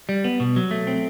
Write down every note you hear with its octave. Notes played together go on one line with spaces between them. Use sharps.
G3
B3
B2
F#3
A3
C4